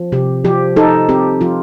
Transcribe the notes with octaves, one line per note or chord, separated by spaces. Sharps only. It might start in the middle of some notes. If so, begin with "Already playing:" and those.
Already playing: F3
C3 G4
F3 G4
D#4 A4
C4 G4
F3 F4